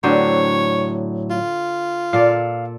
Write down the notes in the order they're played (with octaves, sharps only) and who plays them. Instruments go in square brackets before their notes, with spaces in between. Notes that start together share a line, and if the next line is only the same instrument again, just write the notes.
[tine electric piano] A2 F#3 [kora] D3 G4 C5 [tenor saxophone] C#5
[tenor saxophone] F4
[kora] A#2 A4 D5 [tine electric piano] F5